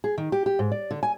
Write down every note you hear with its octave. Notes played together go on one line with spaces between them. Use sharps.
G#4
D#3
G4
G4
G#2
D5
D3
G#5